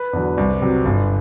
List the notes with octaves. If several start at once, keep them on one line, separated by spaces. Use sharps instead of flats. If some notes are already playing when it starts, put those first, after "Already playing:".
Already playing: B4
E2 D3 F#3
C2
C3 F#3
G1